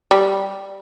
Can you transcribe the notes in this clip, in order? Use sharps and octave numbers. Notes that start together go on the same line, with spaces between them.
G3